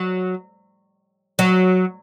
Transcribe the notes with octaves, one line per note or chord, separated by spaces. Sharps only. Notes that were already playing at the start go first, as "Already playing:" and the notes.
Already playing: F#3
F#3